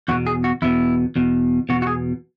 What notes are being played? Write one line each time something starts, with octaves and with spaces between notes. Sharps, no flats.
E2 B2 F#4
G#4
F#4
E2 B2 E4
E2 B2
E2 B2 F#4
F#4
G#4